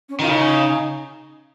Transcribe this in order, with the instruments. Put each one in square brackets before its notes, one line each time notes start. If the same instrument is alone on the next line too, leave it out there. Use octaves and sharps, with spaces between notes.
[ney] C#4
[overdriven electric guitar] D#3 [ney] F4
[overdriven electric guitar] C#3 [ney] D#4